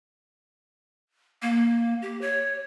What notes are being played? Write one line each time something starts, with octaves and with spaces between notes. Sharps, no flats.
A#3
G4
C#5